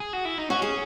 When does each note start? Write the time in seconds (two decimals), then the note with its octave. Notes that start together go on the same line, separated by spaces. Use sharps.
0.00 G#4
0.13 F#4
0.25 E4
0.38 D#4
0.50 C#4 F#4
0.62 G#4